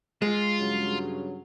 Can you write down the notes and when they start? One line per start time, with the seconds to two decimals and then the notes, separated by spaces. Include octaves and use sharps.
0.22 G#3 F4
0.59 G2 C#3 F#3